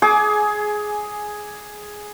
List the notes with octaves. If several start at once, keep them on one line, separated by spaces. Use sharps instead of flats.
G#4 G#5 D6